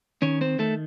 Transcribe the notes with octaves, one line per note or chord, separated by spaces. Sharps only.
D#3 C#4 C#5
C4 C5
D#3 A3 A4